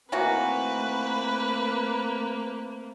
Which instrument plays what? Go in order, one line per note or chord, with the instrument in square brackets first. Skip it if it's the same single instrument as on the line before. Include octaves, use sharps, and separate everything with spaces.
[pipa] D#3 E3 F#4 [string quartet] A3 A#3 C4 [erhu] B4